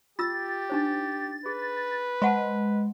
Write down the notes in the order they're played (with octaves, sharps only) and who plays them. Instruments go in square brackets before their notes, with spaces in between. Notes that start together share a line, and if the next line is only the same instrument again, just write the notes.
[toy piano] F4 E6 [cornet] G4 [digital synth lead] A6
[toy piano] D4 D#4 C5
[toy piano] G#4 [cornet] B4
[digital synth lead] G#3 [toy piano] C5 F#5 A5